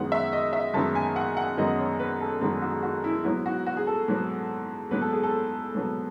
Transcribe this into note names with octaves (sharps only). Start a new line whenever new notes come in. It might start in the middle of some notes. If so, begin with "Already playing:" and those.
Already playing: F#2 D#3 G#3 B3 F#5
E5
D#5
E5
F#2 D#3 G#3 B3 A5
G#5
F#5
F#5
F#2 D#3 G#3 B3 D#5
C#5
B4
A4
F#2 D#3 G#3 B3 G#4
F#4
F#4
E4
G#2 F#3 B3 E4
F#4
F#4
G#4
A4
G#2 F#3 B3
G#2 F#3 B3 B4
A4
G#4
A4
G#2 F#3 B3